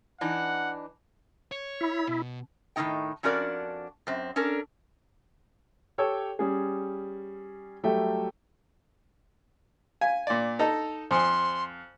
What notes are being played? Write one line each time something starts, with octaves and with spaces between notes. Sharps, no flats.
E3 D4 D#4 F#5
C#5
E4
B2
A2 D#3 F3 C#4 D#4 G5
F2 C#4 D4 F#4 A#4 D5
F#2 C4
C#4 D4 A4 A#4
G4 A4 C#5 G5 E6
G3 C#4 G#4
F#3 G3 A3 A4 E5 G5
F5 G#5
A#2 D5
D#4 A4 A#5
F2 C5 G#5 C6 D#6